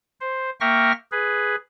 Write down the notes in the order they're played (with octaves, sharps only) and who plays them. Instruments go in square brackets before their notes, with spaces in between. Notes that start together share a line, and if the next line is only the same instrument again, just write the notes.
[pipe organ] C5
A#3 E5 G5 C#6 F6 A#6
G#4 B4